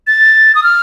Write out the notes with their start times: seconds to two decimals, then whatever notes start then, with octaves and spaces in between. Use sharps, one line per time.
0.07 A6
0.55 D#6
0.63 F6